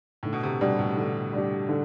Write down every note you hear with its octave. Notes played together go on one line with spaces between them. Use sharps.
A2 D3
B2
C3
B2 G3 D4 G4
A2
D3
G3 D4 G4
D3